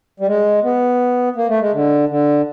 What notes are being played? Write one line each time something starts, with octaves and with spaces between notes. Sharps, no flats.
G3
G#3
B3
A#3
A3
G#3
D3
D3